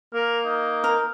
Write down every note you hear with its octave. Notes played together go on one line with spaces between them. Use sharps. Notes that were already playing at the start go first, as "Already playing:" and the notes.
A#3 A#4
D#4
A#4